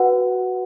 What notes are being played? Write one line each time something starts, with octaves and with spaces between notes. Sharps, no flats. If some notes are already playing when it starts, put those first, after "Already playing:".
Already playing: F#4 B4 F#5